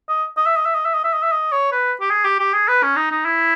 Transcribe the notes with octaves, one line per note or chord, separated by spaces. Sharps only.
D#5
D#5
E5
D#5
E5
D#5
E5
D#5
E5
D#5
E5
D#5
C#5
B4
G4
G#4
G4
G4
G#4
B4
C#4
D#4
D#4
E4